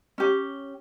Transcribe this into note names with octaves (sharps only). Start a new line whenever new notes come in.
C#4 G4